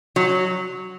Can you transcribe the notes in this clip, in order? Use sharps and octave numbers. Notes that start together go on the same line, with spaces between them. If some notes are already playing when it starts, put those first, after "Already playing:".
F#3